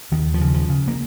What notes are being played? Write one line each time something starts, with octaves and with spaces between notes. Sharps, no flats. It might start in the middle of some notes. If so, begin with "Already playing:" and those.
D#2 D#3
F3
C#3
F3
C#3
A#3